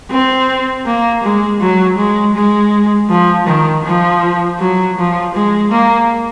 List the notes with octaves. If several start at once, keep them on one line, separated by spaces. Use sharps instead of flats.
C4
A#3
G#3
F#3
G#3
G#3
F3
D#3
F3
F#3
F3
G#3
A#3